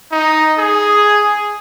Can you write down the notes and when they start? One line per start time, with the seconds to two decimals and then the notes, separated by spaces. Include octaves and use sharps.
0.12 D#4
0.58 G#4